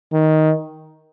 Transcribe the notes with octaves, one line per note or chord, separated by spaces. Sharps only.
D#3